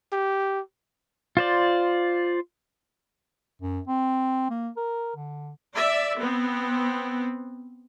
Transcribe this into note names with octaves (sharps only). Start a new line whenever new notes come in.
G4
F4 C5 D5
F#2
C4
A#3
A#4
D3
D5 E5
B3 C4